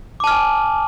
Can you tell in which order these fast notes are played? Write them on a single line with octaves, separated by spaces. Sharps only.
D6 A5 F6 G#5